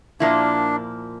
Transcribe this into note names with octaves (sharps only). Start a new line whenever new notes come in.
A#2 F3 A#3 D4 E4